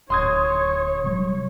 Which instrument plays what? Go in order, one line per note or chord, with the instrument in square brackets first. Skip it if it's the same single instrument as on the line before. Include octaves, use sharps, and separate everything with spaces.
[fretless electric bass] D1 [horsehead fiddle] C#5 [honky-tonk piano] C6 D#6 G#6
[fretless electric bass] C3 F#3 G3